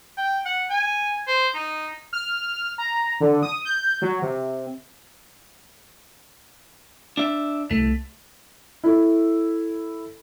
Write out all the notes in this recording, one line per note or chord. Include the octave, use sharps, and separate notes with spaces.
G5
F#5
G#5
C5
D#4
F6
A#5
D3
D#6
G6
F#3
C3
D4 E5
C2 A3
E4 A4